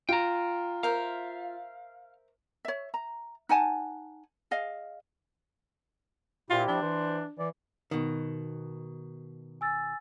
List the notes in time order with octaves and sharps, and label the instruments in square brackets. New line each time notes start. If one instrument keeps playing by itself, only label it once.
[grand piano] F4 [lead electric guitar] G5 A#5
[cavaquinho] A#4 C5 E5 [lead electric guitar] F5
[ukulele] C#5 E5
A#5
D#4 F#5 G#5 A5
G#4 D#5 F5
[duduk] A#2 [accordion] C4 E4 G4 [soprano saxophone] F4
[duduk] F3 [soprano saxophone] D4
[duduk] E3 [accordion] C5
[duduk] E3 [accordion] D5
[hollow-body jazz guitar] B2 D#3
[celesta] G#5 E6 A6